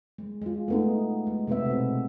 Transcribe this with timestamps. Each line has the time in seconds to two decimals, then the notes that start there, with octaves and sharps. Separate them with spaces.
0.18 G#3
0.42 G#3 F4
0.68 A3 B3 D#4
1.27 G#3
1.47 C3 G#3 B3 B4 E5
1.66 B2 C4